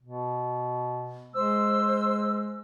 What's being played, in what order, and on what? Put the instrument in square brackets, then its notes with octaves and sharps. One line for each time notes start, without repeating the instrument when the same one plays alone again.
[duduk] B2
[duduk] G#3 [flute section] C5 E6